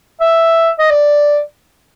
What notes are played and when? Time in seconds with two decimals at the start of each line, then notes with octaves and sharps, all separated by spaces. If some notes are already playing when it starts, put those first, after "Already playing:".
0.21 E5
0.79 D#5
0.90 D5